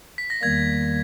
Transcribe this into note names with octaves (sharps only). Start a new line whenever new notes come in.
B6
A#6
E2 D#3 G3 A#3 G#6